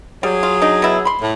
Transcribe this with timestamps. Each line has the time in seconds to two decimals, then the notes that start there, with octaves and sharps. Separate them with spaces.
0.23 F#3 G3 G#4
0.43 F4
0.62 D4 D#4
0.82 B2 E4
1.05 B5 C6
1.21 A2